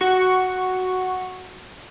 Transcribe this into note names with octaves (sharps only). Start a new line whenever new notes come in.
F#4 C#6